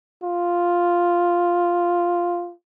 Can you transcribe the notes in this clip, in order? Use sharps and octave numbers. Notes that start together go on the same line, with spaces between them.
F4